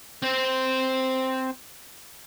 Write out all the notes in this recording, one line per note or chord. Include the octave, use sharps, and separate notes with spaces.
C4 C5